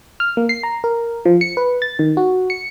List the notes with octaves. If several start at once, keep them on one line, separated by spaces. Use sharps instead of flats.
F6
A#3
C7
A#5
A#4
F3
C#7
B4
A6
D#3
F#4
C#7